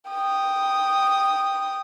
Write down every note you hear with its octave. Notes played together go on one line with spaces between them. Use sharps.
G5 D#6